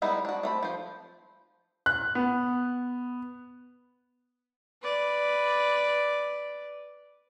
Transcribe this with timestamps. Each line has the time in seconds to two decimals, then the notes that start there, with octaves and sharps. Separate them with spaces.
0.02 G3 G#3 B3 D#4 E4
0.25 D4 F#4
0.43 A3 C4 B5
0.63 F3 C5
1.86 F#6
2.15 B3
4.82 B4 D5